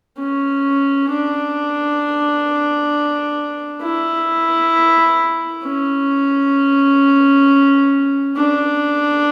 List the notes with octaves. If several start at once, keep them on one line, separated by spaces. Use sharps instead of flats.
C#4
D4
E4
C#4
D4